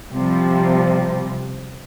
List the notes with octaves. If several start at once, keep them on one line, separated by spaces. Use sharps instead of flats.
C3 F3 G3